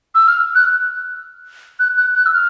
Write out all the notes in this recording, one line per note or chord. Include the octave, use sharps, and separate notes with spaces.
E6
F6
F#6
F#6
F#6
F#6
E6
F6